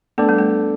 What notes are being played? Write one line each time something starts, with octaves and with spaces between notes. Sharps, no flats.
A3 B3 D4 A4 D5
G3
A3